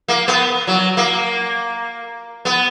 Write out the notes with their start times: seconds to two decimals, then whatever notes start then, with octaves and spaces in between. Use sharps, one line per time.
0.08 A#3
0.28 B3
0.67 F#3
0.97 A#3
2.45 B3